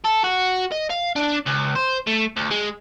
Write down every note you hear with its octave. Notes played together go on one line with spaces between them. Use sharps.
A4
F#4
D#5
F5
D4
C#2
C5
A3
D2
G#3